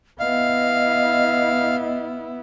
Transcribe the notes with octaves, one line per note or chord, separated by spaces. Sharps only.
B3 E4 D#5 F5